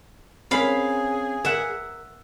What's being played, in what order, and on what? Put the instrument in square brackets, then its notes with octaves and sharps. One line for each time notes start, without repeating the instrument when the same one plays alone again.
[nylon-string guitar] C4 C#4 A#4 [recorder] G#4 [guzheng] F5 B5
[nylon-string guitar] A#4 [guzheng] E5 F#5